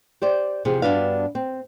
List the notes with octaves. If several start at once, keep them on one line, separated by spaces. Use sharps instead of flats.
G4 C5 D5
E2 C3 F3 G#4
G2 B3 D4 F#4 B4 F5
C4